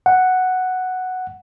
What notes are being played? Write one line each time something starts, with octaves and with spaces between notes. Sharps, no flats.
F#5